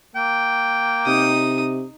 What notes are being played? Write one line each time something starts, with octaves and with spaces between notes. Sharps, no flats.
A#3 G5
C3 D#4 D#6